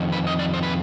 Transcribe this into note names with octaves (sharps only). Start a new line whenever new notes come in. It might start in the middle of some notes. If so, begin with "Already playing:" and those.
Already playing: F2 D#3
B4
D#5
D5
C5
B4